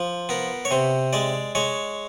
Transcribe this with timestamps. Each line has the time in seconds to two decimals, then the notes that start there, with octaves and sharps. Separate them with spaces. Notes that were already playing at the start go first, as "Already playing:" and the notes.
Already playing: F3
0.29 B3 A#4
0.65 C#5
0.71 C3 C5
1.13 G#3 D5
1.55 G#3 C#5